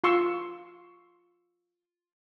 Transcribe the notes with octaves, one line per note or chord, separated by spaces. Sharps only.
F4 C6 C#6 E6